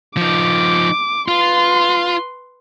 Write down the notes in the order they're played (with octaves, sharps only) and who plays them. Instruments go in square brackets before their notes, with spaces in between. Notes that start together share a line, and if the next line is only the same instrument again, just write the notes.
[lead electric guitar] F3 D#4 [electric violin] D6
[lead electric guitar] F4 [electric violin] B4 C6